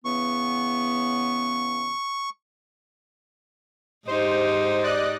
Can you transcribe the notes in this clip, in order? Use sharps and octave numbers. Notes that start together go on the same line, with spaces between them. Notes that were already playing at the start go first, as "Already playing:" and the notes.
C#3 E3 B3 C#6
G#2 D#4 G4 C5
D5 D#5 F#6